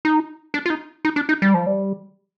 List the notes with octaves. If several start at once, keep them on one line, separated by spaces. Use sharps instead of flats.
D#4
D4
F4
D#4
D#4
D4
D#4
G3
F3
G3